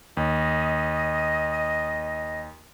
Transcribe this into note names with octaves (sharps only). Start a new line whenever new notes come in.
D#2 D#5